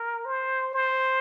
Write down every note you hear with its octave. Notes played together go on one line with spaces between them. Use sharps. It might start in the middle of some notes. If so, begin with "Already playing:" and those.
Already playing: A#4
C5
C5